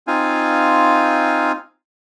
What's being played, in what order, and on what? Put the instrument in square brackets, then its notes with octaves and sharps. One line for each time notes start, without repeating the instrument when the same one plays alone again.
[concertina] C4 D#4 F4 F5 G#5